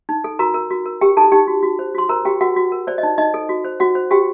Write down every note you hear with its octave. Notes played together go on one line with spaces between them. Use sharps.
D#4
A4
F#4 A#4 A#5
A#4
F#4
A#4
G4 A#4 G5
D#4 A4 A5
D#4 G4 G5
F#4
F#4
C5
F#4 C6
A#4 C5 A#5
F#4 G4 G5
F#4 A#4 F#5
F#4
A#4
C5 D5
D#5
D#4
D#4 D#5
A4
F#4
C5
F#4 F#5
C5
F#4 G4 G5